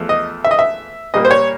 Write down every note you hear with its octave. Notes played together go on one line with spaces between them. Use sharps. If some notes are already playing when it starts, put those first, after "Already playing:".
Already playing: E2 F3 A3
D#5
E5
D#5
E5
A#2 G3 A#3 D#5
C5
C#5